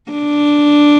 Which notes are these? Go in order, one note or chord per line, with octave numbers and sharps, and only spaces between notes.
D4